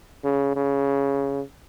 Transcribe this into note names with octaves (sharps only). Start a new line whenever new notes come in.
C#3
C#3